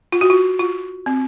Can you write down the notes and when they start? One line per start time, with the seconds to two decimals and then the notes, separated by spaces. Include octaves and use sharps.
0.12 F4
0.21 F#4
0.30 F4
0.59 F4
1.06 C4